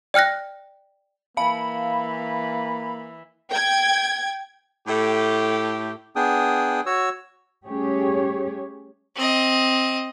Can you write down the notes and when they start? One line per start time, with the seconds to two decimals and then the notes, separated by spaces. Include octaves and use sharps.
0.14 D5 G5 F6 F#6 A#6
1.37 E3 A#3 F5 B5
3.50 G5 G#6
4.88 A2 A3 G4
6.16 B3 D4 G#4 G5 D#6
6.86 F#4 C#5 E6
7.66 G3 A3 C#4 G4 G#4 C#5
9.15 C4 D#5